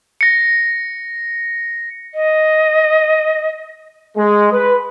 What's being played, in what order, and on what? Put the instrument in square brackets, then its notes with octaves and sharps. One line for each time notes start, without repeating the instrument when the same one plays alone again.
[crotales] A#6 C#7
[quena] D#5
[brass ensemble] G#3
B4